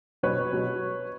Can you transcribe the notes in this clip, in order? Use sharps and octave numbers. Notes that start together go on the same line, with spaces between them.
B2 F#3 B3 B4 C#5
B2 F#3